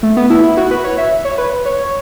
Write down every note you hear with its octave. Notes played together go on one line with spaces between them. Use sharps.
A3
B3
E4
E4
F#4
B4
C#5
E5
C#5
B4
C#5